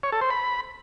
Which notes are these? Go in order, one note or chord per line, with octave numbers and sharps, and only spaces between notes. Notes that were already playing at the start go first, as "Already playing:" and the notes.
C#5
A4
C5
B5